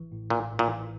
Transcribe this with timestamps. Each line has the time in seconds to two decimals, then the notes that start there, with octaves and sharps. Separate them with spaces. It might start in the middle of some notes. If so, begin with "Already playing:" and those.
Already playing: A1 E3
0.12 A2
0.30 A1 A#2
0.50 A1
0.59 A#2
0.68 E3